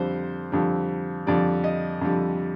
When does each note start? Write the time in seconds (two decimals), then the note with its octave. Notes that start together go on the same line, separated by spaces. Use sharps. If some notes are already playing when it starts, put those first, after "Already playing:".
Already playing: F2 D3 G3 C5
0.52 F2 D3 G3
1.27 F2 D3 G3 D5
1.64 D#5
2.01 F2 D3 G3